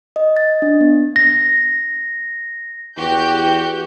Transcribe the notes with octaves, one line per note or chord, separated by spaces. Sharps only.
D#5
A6
D4
B3
A#6
E2 F#4 G4 G6